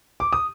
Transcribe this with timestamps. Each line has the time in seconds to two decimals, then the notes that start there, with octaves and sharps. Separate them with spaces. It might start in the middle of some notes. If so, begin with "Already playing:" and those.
0.20 D6
0.33 D#6